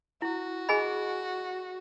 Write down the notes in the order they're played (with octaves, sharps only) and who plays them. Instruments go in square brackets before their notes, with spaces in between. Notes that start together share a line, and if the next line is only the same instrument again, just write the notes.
[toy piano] E4 [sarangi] F#4
[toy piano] G#4 D#5 G#5 B5